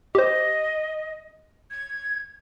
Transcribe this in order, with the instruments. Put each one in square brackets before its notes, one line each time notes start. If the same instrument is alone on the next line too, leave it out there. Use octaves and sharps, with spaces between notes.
[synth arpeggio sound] G4 C5 [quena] D#5
[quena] G#6